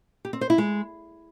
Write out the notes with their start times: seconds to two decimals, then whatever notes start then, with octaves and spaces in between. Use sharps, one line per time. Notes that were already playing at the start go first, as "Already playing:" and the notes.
0.25 G4
0.33 C4
0.41 C5
0.50 E4
0.58 G#3